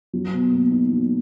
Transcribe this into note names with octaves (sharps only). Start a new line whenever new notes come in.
F#3
B2
A#3
D#4
F#3